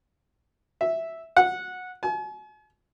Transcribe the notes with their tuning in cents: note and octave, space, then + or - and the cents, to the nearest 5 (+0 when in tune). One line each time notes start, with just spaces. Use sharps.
E5 -5
F#5 -15
G#5 +45